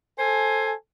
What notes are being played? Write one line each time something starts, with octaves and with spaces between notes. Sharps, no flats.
A4 C5 G#5